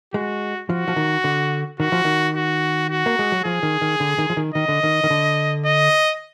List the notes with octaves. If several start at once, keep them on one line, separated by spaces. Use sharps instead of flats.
G#3 F#4
F3 F#4
F3
D#3
D3
D#3 F#4
F3
D#3
F#4
F#4
A#3
G#3
F#3
F3 G#4
D#3
D#3
D3
D#3
F3
D#3
D#3 D#5
D3
D#3
D#3
D3
D#5